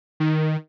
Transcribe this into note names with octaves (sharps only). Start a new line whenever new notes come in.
D#3